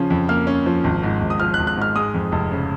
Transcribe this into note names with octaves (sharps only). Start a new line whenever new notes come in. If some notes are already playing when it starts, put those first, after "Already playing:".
Already playing: C#3 F3 C#4
F2
A#3 F6
C#4
F3
G#1
G#2
G#1
D#6
F3 F6
F#6
G#1
F#6
G#2 F6
G#3 D#6
F2
F1
C#3